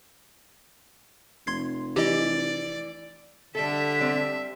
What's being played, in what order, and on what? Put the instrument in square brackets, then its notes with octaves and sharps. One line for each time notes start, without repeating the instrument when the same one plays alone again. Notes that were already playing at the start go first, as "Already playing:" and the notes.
[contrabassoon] F1 [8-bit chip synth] C6 G#6 C7
[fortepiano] E3 [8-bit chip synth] G4 D#5 [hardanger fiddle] D5
[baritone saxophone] D3 [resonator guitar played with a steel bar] G3 A4 [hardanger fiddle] E5 [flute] B6
[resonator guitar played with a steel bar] G3 C4